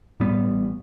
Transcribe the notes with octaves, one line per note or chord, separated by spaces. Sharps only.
A2 G3 B3
A1